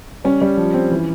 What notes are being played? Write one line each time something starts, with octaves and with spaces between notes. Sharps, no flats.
G3 C#4
G3
F3
C4
E3